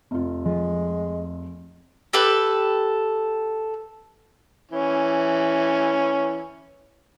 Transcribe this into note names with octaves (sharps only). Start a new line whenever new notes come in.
F1 F4
F3 G#3
G4 A4 B4
E3 C#4